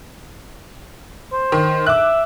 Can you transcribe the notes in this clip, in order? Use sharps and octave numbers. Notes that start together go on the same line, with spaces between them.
C5
D#3
E5 D6 F#6